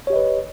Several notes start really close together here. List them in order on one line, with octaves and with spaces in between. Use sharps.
C#5 G4 D#5 B4